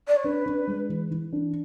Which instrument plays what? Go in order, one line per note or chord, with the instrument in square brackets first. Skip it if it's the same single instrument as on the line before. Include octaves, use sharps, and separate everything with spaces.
[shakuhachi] D5
C#5
[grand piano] D4 [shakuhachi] B4
[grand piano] D4
G#3
E3
E3
D4